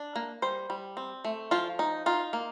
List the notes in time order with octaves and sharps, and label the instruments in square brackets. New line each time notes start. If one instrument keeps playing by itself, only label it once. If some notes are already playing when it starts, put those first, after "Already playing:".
Already playing: [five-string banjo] D4
A#3
G3 C5
G3
C4
A3
F3 F4
D#4
D#4 F4
A#3